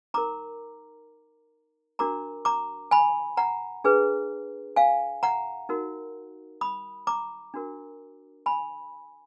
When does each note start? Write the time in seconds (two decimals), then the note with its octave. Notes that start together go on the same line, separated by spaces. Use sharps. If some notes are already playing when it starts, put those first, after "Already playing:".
0.14 D#4 A#4 A#5 D6
1.99 D4 F#4 A#4 A#5 D6
2.45 A#5 D6
2.91 G#5 B5
3.37 F#5 A#5
3.84 D4 G#4 B4
4.76 F5 G#5
5.23 F#5 A#5
5.69 D#4 F#4 A#4
6.61 B5 D#6
7.07 A#5 D6
7.54 D4 F#4 A#4
8.46 G#5 B5